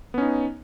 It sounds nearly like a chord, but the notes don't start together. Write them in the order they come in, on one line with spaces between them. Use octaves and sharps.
B3 C#4 D#4